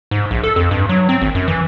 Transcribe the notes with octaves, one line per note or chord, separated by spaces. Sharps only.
G#2
A#1
A4
F2
G2
F#3
C4
G#1
F#2
E3